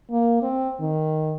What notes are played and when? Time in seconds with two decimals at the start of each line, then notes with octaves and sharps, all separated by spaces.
0.11 A#3
0.42 C4
0.80 D#3